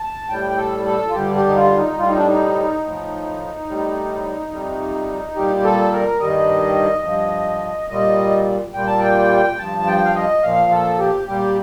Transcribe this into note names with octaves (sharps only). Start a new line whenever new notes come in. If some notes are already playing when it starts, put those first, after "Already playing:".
Already playing: A5
A2 G3 G5
A4
A4
F4
G2 D3 G3 G4
G4
D#4
F4
D#4
A2 G3 F4
D#4
D4
D#4
A2 F3
A2 G3
F2 C3 G3
A#2 G3 G4
A4
A#4
G2 D#3 G3 D#5
G2 F3
A#2 G3 D#5
A#2 G3 G5
A5
G5
G2 F3 A5
G5
F5
D#5
A#2 F3 F5
A4
G4
A#2 G3 G4